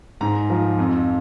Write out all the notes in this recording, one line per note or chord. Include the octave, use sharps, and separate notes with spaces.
G#2 A#5
F3
F2